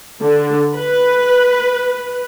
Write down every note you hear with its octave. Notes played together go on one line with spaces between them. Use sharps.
D3
B4